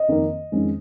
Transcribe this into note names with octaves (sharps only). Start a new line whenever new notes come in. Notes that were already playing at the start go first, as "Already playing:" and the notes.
Already playing: D#5
F2 D#3 A#3
F2 D#3 G#3 C#4